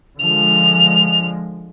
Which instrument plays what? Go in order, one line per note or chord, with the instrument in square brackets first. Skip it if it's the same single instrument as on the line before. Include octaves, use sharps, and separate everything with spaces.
[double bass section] D3 F3 G#3 [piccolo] F7